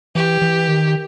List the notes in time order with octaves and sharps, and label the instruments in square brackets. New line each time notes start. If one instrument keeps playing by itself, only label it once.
[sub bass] E3 [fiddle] G4
[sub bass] E3
D#3